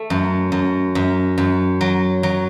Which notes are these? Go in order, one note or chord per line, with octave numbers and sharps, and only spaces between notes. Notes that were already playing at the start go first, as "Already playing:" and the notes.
Already playing: A3
F#2
F#2
F#2
F#2
F#3
F#3